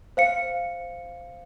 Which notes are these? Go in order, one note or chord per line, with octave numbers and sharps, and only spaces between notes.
C5 F5 C#7